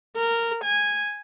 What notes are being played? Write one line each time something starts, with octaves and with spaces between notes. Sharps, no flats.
A#4
G#5